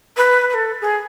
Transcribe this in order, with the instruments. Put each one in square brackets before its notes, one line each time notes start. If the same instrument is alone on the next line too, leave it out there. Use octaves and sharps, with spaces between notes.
[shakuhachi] B4
B4
A4
G#4